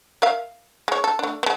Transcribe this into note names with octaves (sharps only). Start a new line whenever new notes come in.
A#4 E5 F5
G#3 C#5
A4
A3 D4
G#3 B3